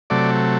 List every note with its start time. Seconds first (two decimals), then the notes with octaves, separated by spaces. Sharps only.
0.10 C3 F#3 A3 D5